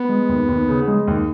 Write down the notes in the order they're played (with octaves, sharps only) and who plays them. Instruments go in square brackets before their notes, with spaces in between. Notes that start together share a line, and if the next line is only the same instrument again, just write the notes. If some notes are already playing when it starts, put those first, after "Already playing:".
Already playing: [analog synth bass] B3
[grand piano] G#3
D#2
D#2
C#3
G#3
D#2